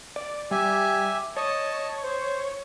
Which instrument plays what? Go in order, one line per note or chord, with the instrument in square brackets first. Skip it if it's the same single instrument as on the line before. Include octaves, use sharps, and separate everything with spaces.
[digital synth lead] D5
[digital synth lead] G3 [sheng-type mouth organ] G4 E5 G#5
[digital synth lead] C#5 [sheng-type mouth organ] D#5 A5
[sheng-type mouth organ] C5